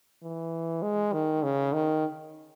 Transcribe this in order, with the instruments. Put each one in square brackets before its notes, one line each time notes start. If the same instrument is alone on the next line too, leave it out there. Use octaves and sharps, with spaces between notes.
[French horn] E3
G#3
D#3
C#3
D#3